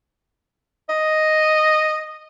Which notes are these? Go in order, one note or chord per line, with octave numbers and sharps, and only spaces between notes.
D#5